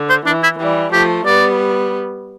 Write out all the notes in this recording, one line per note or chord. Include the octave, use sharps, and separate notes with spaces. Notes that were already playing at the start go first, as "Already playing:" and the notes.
Already playing: D3
C5
E3 D4
E4
E3 G3
F3 A3 G4
G3 B3 D5